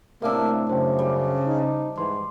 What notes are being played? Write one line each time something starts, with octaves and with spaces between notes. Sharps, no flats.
A2 C3 A#3 D4 A#4 E6
F#2 C#3 C5 G5
G3
D#4
G#2 E3 C6